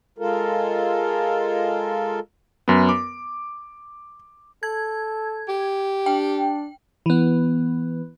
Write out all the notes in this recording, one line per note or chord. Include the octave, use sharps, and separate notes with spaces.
G#3 F4 A4 A#4
F#2 B3
D6
A4 G#6
G4
D4 G5
E3 B3